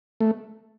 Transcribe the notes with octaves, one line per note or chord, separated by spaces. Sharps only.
A3